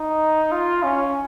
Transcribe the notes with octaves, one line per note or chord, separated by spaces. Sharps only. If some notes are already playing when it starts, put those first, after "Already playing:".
Already playing: D#4
F4
C#4